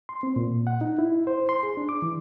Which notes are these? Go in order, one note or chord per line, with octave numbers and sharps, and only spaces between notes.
C6
C4
A#2
F#5
D#4
E4
C5
C6
G#4
D4
D6
E3